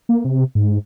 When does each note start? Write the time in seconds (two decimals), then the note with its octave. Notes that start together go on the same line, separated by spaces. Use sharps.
0.09 A#3
0.25 C3
0.55 G#2